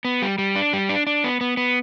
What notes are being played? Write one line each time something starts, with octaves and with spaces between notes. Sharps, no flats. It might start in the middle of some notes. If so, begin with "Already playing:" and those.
B3
G3
G3
D4
G3
D4
D4
B3
B3
B3